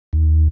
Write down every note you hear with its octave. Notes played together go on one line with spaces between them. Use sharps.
D#2